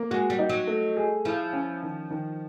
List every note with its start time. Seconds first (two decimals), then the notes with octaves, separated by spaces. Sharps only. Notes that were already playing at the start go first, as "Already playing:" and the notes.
Already playing: A#3
0.11 G#3 F#4
0.30 G3
0.39 D#4
0.49 F#3
0.67 A3
0.97 G#4
1.25 F3 E4
1.53 C#4
1.83 D#3
2.10 D#3